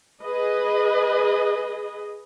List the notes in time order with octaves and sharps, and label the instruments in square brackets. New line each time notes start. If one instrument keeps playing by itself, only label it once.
[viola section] G#4 B4 D#5